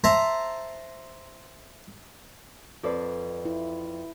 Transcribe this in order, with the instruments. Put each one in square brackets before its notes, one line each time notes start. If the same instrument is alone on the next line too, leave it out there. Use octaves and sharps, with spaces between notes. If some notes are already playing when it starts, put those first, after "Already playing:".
[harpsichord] C5 E5 A5 A#5
[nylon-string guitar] F2 A4 D5 [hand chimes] F4 B4
[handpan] E4